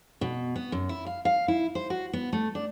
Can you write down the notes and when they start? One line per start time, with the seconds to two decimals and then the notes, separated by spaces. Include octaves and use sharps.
0.21 B2
0.56 B3
0.72 F#2
0.89 E4
1.06 F5
1.25 F5
1.48 E4
1.75 C5
1.90 F#4
2.13 B3
2.33 A3
2.55 D4